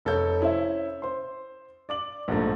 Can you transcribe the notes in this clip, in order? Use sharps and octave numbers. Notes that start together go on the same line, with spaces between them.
F1 A4 C#5 G6
C#4 E4 C5 E5
C5 C6
D5 D6 F#7
A#1 G#2 A3